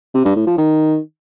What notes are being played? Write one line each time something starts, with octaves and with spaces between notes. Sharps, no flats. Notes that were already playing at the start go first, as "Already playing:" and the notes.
C3
G2
A2
F3
D#3